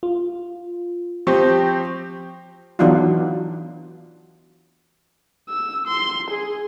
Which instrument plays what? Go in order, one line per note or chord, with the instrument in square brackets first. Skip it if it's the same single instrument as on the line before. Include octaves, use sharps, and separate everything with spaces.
[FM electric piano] F4
[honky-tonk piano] F3 C4 G4 [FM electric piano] C#6 G6 A#6
[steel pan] E3 F#3 B3 D4 D#4 F4
[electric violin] E6
C6
G#4